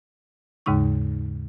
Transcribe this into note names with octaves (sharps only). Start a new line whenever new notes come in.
D#2 G#2 C#3 G#3 D#4 C#6